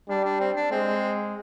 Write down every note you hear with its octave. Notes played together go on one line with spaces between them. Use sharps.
G3 D4
D4
C4
D4
G#3 C4